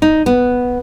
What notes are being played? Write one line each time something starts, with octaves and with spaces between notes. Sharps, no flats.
D#4
B3